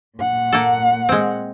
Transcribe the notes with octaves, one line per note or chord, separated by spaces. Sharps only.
A#2 F#5
A#3 A4
G#3 C4